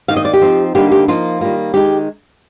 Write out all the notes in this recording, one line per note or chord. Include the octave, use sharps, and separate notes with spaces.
D#3 A#3 D#4 F5
D#5
D5
G4
F3 C4 D#4
D3 G3 A#3 D#4 G4
G4
F3 A#3 D#4 F4
D#3 G3 A#3
D#3 G#3 D#4 G4